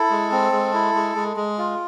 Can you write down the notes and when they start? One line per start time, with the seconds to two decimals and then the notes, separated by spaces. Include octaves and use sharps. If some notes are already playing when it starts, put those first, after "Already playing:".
Already playing: E4 A4
0.10 G#3
0.32 C4
0.52 G#3
0.74 E4
0.95 G#3
1.16 G#3
1.36 G#3
1.58 F4